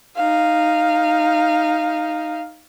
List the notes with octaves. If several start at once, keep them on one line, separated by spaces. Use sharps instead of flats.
D#4 F5